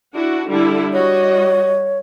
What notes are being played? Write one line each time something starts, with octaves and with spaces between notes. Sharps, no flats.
D4 E4 F#4
D3 G3 E4
G3 F#4 C#5 D#5